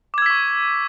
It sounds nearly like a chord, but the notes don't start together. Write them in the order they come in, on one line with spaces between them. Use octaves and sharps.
D6 G#6 E6 B6 C#6